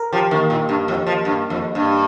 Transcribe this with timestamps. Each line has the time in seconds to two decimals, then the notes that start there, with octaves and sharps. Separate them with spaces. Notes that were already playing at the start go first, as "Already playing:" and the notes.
Already playing: A#4
0.12 F3 G4
0.31 D#3 A#3
0.50 A#2
0.69 G2
0.88 F2
1.07 F3
1.25 G2
1.50 F2
1.75 G2